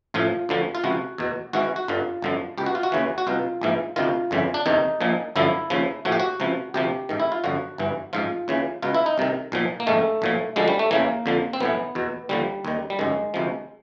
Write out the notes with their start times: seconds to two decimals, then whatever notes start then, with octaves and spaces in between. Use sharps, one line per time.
0.14 A1 A2 F3 F4
0.49 D2 D3 F3
0.75 F4
0.84 C#2 C3 F3 F#4
1.18 E2 B2
1.53 G#1 G#2 E3 F#4
1.76 F#4
1.88 G1 G2 D3 F4
2.22 G1 F#2 D3 F3
2.58 C#2 B2 G4
2.66 F#4
2.75 F4
2.83 F#4
2.92 D#2 C#3 E3
3.18 F#4
3.27 C2 B2 F4
3.61 A#1 G#2 E3
3.96 D2 C3 D#3 F4
4.31 G1 F2 C#3 E3
4.54 D4
4.66 E2 C3 D#3 D#4
5.01 A#1 A#2 F3
5.36 G1 F#2 D3 F3 E4
5.70 D#2 C#3 F3
6.05 A#1 A2 F3 F#4
6.12 G4
6.20 F#4
6.40 C#2 C3 F3
6.74 D2 C3 F3 G4
7.09 A1 G#2 D#3
7.20 E4
7.32 F4
7.44 G1 F#2 D3 F3 F#4
7.78 G1 G2 E3
8.13 A1 G#2 F3 F4
8.48 D#2 C#3 E3
8.82 C#2 B2 F4
8.95 E4
9.06 D#4
9.18 C2 C3 D#3
9.52 B1 A#2 F3
9.80 A#3
9.87 A#1 G#2 D#3 A3
10.22 B1 A#2 F3
10.56 D2 D3 F3 G#3
10.68 G3
10.79 A3
10.91 E2 C#3 E3 A#3
11.26 F2 D3 F3
11.53 C4
11.60 B1 A2 E3 B3
11.95 E2 B2
12.29 D#2 D3 F3 G3
12.65 D#2 D#3
12.90 G3
12.99 G1 F#2 D#3 G#3
13.34 D2 C3 F3